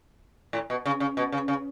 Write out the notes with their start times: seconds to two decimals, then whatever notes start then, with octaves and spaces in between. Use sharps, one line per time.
0.53 A2
0.70 B2
0.86 C#3
1.00 C#3
1.17 B2
1.32 C#3
1.48 C#3